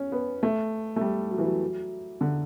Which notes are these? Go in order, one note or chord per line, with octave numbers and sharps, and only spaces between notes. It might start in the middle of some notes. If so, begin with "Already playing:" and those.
Already playing: C#4
B3
A3
A3
G3
F#3
E3
F#3
D3